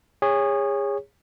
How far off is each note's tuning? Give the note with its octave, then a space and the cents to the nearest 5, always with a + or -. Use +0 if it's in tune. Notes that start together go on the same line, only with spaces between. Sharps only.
G#4 -30 C#5 +0